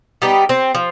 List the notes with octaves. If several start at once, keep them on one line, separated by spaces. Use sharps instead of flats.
G3 B3 D#4 G4
C4
F3